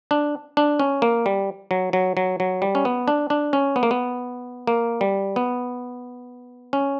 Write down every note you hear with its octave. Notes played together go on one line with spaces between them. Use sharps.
D4
D4
C#4
A#3
G3
F#3
F#3
F#3
F#3
G3
C#4
B3
D4
D4
C#4
B3
A#3
B3
A#3
G3
B3
C#4